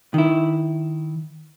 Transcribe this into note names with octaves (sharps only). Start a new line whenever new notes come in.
D#3 E4